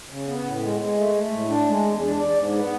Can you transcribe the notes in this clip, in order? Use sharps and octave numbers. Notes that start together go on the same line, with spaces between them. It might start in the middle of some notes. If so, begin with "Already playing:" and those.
C#3
B3
A2
G#3
G#3
A3
A3
A2
D4
G#3
E2
D4
D5
G#2
B3